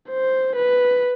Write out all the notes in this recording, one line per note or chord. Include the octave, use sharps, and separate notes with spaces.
C5
B4